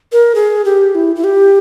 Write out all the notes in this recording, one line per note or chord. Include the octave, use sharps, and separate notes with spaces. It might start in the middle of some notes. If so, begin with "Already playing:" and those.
A#4
G#4
G4
E4
E4
G4